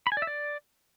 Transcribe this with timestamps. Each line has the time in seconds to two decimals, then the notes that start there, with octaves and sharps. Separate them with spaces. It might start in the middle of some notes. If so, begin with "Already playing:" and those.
0.07 B5
0.12 G#5
0.17 D5
0.22 E5
0.27 D5